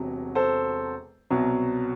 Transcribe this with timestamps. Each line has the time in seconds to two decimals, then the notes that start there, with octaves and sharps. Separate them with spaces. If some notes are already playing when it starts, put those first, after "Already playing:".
Already playing: E1 E2 C3 F#3
0.35 A4 C5
1.30 C2 B2 F#3